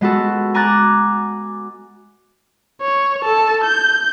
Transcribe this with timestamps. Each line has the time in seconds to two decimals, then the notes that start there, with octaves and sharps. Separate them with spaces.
0.01 G#3 B3 F#4 A4
0.54 G#5 A#5 D6 F#6 G#6 A6
2.82 C#5
3.23 A4 A5
3.64 G6